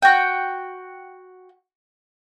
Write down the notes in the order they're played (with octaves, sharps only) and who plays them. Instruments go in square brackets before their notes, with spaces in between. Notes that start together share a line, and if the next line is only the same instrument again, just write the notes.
[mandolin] F#4 G5